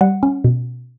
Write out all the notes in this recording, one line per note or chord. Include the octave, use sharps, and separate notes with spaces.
G3 F#5
C#4
B2